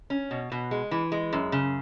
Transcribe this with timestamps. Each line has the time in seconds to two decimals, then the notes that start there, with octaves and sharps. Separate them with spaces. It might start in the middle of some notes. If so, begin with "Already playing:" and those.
0.10 C#4
0.31 B2
0.52 B2
0.71 G#3
0.91 E3
1.12 G#3
1.33 F#2
1.52 C#3